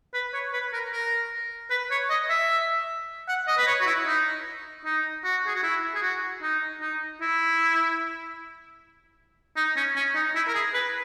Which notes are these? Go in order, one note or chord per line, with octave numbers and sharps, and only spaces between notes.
B4
C#5
B4
A#4
A#4
B4
C#5
D#5
E5
F#5
D#5
B4
C#5
F#4
E4
D#4
D#4
F#4
G#4
F#4
E4
G#4
F#4
D#4
D#4
E4
D#4
C#4
C#4
D#4
E4
A#4
G#4
B4